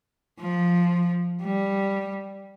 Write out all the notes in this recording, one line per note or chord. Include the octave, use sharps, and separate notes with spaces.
F3
G3